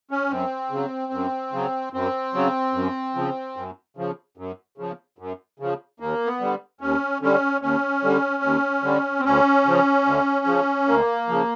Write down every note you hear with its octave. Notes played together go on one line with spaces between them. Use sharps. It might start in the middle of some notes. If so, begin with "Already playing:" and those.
C#4
F#2 C4
C#3 F#3
F#2
C#3 F#3
F#2 C4
C#3 F#3
F#2
C#3 F3
F#2
C#3 F3
F#2
C#3 F3
F#2
C#3 F3
D#2 A#3
B3
D3 G3
D#2 C#4
D3 G3 C#4
D#2 C#4
D3 G3
D#2
D3 G3
C4
D2 C#4
C#3 F3
D2
C#3 F3
D2 A#3
C#3 F3